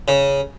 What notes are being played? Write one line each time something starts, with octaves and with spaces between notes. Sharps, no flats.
C#3